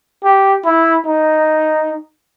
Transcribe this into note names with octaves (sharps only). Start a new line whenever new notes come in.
G4
E4
D#4